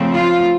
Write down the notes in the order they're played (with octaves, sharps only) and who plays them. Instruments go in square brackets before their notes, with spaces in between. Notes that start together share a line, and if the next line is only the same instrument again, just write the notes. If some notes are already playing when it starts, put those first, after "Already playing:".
Already playing: [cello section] C#3 F3 A3 C4
F4